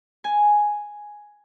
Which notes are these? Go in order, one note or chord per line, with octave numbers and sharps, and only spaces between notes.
G#5